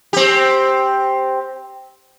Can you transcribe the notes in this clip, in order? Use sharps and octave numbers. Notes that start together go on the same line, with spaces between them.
C4 G4